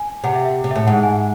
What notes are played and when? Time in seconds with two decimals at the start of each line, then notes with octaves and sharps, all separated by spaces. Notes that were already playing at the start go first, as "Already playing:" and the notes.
Already playing: G#5
0.24 C3 F#5
0.35 E5
0.45 E5
0.64 C3
0.71 A2 E5
0.87 G#2 F#5
1.03 G#5